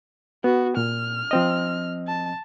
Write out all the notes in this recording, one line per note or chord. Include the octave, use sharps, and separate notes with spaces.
B3 F#4
A#2 F6
F3 C4 D#5
A5